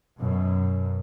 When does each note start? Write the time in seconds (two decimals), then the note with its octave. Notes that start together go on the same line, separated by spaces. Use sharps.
0.19 F#2 B2